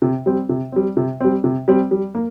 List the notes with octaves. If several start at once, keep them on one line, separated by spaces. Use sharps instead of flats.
C3
G3 C4
C3
G3 C4
C3
G3 C4
C3
G3 C4
G3
A#3